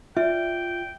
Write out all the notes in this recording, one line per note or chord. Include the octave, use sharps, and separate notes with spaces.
F4 D5 E5 G5